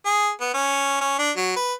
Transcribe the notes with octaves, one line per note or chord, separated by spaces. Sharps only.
G#4
B3
C#4
C#4
D4
F#3
B4